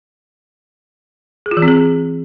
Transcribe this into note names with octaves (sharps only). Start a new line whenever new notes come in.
G#4
F4
E3
C4
G#4